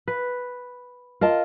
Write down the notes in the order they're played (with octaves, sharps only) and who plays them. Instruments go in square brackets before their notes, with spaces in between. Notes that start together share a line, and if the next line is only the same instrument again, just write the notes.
[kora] B4
[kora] F4 [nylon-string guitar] A#4 D#5 A5